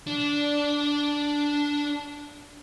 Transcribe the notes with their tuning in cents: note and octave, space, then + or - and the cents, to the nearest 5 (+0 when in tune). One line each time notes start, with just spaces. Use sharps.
D4 -10